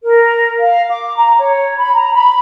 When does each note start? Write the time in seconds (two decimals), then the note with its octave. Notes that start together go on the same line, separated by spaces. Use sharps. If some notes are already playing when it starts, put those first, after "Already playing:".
0.04 A#4
0.59 F5
0.90 D6
1.16 A#5
1.40 C#5
1.77 B5
1.94 A#5
2.14 B5